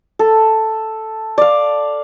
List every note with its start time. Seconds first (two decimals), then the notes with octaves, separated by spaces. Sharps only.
0.19 A4
1.38 D5 F5